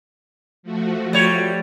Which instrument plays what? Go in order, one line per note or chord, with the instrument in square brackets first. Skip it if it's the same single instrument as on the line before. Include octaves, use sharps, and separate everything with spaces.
[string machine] F3 A3 F#4
[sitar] G3 C#5